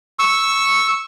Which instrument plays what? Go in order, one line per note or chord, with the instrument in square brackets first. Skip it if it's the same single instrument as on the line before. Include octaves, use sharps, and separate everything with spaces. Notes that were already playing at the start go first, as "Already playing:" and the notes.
[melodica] C#6 E6